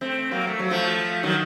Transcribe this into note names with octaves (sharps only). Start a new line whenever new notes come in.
A3 C4
F#3 A#3
A3
F#3
F3 A3
D#3 F#3